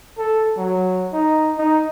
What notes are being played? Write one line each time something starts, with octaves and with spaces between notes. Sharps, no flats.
A4
F#3
D#4
D#4